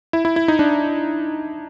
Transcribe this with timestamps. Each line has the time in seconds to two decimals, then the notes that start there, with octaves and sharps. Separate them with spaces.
0.13 E4
0.25 E4
0.36 E4
0.48 D#4
0.59 D4